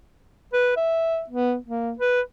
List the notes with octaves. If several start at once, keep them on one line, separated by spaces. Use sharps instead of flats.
B4
E5
B3
A#3
B4